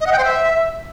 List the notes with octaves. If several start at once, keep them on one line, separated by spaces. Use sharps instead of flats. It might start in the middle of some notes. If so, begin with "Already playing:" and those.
D#5
F#5
G5
C5
E5